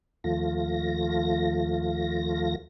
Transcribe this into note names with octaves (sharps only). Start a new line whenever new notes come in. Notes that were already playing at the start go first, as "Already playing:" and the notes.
D#2 F3 A3 F4 A#6